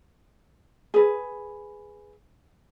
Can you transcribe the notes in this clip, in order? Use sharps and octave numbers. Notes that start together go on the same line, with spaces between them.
G#4 B4